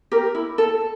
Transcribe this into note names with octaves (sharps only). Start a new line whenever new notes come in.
G4 A#4
E4
A4